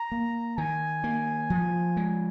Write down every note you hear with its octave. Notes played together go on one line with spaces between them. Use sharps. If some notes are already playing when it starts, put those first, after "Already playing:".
Already playing: A#5
A#3
D#3 G#5
A#3
F3
G#3